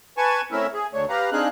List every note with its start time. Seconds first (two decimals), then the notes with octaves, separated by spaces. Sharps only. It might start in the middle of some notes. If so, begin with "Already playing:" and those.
0.17 B4 G#5 A5 C#6
0.52 A3 C4 C#4 E4 A#4 E5
0.74 G#4
0.93 D2 A3 D4 C#5
1.09 G4 B4 F5 A#5
1.32 C4 D4 D#4 G#4 F5 F#6